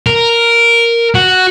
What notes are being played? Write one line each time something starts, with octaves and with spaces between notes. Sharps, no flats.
A#4
F#4